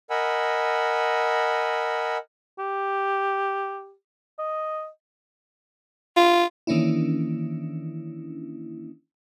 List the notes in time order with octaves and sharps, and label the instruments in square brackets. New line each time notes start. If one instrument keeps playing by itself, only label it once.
[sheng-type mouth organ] A#4 D#5 F#5 G#5 B5 E6
[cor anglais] G4
D#5
[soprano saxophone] F4
[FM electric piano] D#3 E3 A#3 C#4 D4 E4